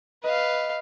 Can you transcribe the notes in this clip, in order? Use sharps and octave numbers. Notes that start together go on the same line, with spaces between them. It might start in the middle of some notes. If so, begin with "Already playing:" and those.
B4 D#5 F5